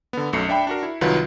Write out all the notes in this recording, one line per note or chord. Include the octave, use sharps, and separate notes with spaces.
D3 B3
B1 F#2 A3 C7 C#7
D4 E5 G5 B5
D4 F#4 A#4
E4
C2 D#3 F#3 F4 B4